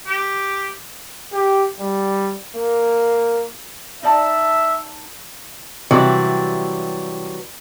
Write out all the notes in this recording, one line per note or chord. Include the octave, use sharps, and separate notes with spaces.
G4
G4
G3
A#3
D#4 D5 E5 A5
C3 E3 F#3 G3